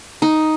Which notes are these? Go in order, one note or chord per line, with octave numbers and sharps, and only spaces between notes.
D#4